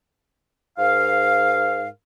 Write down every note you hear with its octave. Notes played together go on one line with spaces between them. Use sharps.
G#2 A#4 F5